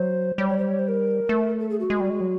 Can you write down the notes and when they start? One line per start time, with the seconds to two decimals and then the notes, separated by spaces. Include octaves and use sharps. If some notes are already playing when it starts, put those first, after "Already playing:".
Already playing: F#3 C5
0.38 G3 C#5
0.48 C#5
0.58 C5
0.69 C#5
0.79 C5
0.88 A#4
1.29 A3
1.60 A4
1.70 G#4
1.80 F#4
1.90 G#3
2.00 G3
2.10 G#3
2.21 F#3